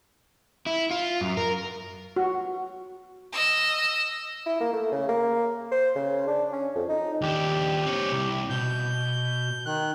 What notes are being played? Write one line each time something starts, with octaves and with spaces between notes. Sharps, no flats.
E4
F4
F#2
A#4
F#4
D#5 E6
E4
A#3
A3
C#3
A#3
C5
C#3
D4
C#4
F2
D#4
D#2 D4 G4
C4 C#5
C2
B2 G6
D#3 F#6